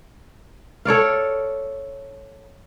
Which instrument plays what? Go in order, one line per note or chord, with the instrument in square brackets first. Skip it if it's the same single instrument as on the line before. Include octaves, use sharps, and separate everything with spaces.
[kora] A4 C#5 D5 F5